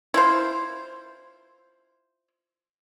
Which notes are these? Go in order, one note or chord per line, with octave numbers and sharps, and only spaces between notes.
E4 F4 C5